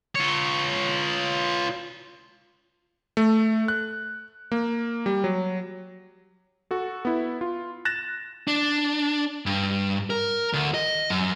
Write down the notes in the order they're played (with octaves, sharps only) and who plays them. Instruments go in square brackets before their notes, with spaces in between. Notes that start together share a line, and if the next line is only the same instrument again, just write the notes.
[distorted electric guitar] F4 C#5
[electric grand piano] A3
F#6
A#3
G3
F#3
F#4 A4
B3 E4
F4
F#6 A6 A#6 E7
[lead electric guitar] D4
G2
A#4
D2
D#5
F#2